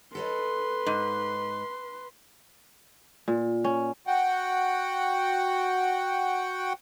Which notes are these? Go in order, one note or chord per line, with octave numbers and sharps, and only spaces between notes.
A4 B4 C#5 D#5 C6
G#2
A#2
C#4
F#4 F#5 G5